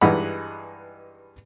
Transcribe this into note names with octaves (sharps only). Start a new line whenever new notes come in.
G2 E3 G#3 D#4 F#5 B5